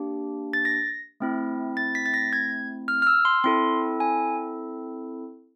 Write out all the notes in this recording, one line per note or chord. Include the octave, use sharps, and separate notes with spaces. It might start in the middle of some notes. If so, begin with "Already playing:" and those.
Already playing: A#3 D4 G4
A6
A#6
A3 C4 E4
A6
B6
A6
A#6
G#6
F6
F6
E6
C6
C4 E4 A4 C6
G#5